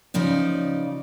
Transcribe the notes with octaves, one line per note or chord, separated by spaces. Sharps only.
C#3 F3 D#4 D5